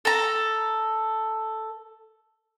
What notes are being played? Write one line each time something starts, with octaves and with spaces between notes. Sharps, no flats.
A4 A#5